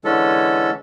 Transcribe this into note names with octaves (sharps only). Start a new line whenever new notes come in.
D3 E3 G#3 C#4 A4